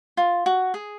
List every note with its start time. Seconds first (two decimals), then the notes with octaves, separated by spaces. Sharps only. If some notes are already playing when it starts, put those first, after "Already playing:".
0.17 F4
0.46 F#4
0.74 G#4